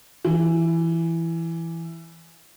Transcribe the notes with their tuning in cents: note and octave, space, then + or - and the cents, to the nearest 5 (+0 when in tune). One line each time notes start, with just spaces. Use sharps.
E3 +10